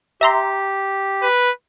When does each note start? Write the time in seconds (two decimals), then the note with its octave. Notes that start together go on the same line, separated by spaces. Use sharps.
0.21 G4 E5 A#5 C6
1.22 B4